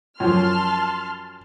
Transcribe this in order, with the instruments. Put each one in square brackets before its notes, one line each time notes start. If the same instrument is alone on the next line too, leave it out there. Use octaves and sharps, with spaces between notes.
[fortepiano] F#2 F3 [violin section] A5 C6 F6